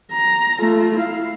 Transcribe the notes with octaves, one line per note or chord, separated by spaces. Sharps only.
A#5
A3 F4
E4 F5